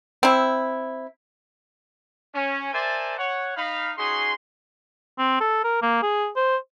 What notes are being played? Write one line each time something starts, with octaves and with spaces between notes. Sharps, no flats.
C4 E4
C#4
A#4 C5 D5 E5 G#5 A5
C#5 F#5
D#4 F5 B5
C#4 D#4 F#4 G#4 C6
C4
A4
A#4
A#3
G#4
C5